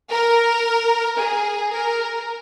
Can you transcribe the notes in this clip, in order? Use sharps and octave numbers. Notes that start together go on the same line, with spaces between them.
A#4
G#4
A#4